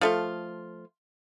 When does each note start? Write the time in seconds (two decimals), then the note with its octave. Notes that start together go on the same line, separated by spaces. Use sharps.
0.01 F3 A3 F4